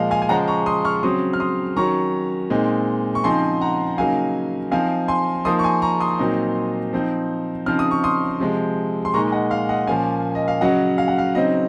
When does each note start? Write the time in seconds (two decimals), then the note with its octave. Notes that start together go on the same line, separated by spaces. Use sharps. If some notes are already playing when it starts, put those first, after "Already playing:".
Already playing: A#2 F3 G#3 D#5 F5
0.11 F5 G#5
0.22 G#5
0.29 C#3 F3 G#3 C#4 F#5 A#5
0.48 A#5 C#6
0.66 C6 D#6
0.85 C#6 F6
1.03 C#3 F#3 C4 C6 D#6
1.33 F6
1.40 C6 D#6
1.76 D#3 F#3 C#4 A#5 C#6
2.50 A#2 G#3 C4 D#4
3.15 C#6
3.24 C#3 F3 C4 D#4 G#5 C6
3.61 F#5 A#5
3.98 C#3 F#3 A#3 D#4 F5 G#5
4.72 F3 C4 D#4 F5 G#5
5.08 G#5 C6
5.45 F3 A#3 D#4 C6 D#6
5.59 C#6
5.64 G#5 C6
5.82 A#5 C#6
6.00 C6 D#6
6.19 A#2 F#3 C4 D#4
6.93 F3 C4 D#4
7.66 C#3 F3 C4 D#4 F6
7.79 D#6
7.91 C#6
8.04 C6 D#6
8.40 C3 F3 G#3
9.05 C6
9.14 A#2 G#3 D#4 A#5 C#6
9.32 D#5 F#5
9.51 F5
9.69 D#5 F#5
9.87 A#2 F3 A#3 C#4 F5 G#5
10.35 D#5
10.48 F5
10.61 C#3 F#3 C#4 D#5 F#5
10.98 F5
11.08 F#5
11.18 F5
11.35 C#3 F#3 C4 D#4 D#5